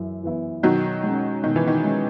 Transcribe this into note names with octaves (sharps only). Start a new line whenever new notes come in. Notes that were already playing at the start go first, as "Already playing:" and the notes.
Already playing: F#2 E3 E4
E3 B3 E4
B2 D#3 F#3
G#3 C#4
B2 D#3
E3
D#3
G#3 C#4